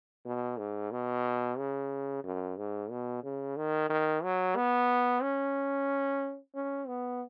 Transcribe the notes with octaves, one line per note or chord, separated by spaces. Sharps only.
B2
G#2
B2
C#3
F#2
G#2
B2
C#3
D#3
D#3
F#3
B3
C#4
C#4
B3